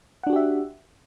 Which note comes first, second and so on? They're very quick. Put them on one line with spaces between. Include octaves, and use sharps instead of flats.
F#5 D4 F#4 G4 E5